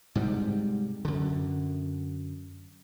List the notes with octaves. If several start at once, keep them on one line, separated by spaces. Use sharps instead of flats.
G#2 C3 G3
F#2 D3